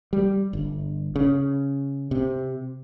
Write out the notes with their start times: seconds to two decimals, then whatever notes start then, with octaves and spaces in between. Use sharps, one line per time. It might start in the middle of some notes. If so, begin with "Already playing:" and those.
0.13 G3
0.53 G1
1.16 C#3
2.11 C3